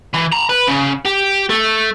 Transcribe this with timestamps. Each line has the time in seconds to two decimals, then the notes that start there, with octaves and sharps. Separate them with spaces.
0.14 E3
0.33 A5 A#5
0.50 B4
0.68 C#3
1.06 G4
1.50 A3